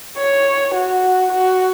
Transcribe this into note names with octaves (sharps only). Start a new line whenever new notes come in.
C#5
F#4
F#4